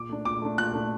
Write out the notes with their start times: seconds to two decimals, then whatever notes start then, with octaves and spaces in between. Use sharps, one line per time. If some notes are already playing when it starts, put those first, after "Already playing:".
Already playing: A#2 D6
0.09 A3 D4
0.25 A#2 D6
0.42 A3 D4
0.58 A#2 F#6
0.73 A3 D4